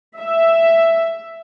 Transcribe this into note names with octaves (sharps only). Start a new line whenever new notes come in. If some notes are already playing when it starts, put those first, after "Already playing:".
E5